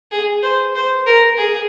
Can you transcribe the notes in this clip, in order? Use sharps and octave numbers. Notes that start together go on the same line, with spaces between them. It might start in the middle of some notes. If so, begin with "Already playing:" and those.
G#4
C5
C5
A#4
G#4